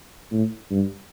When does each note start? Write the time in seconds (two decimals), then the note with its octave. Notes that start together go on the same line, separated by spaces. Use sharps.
0.32 A2
0.70 G2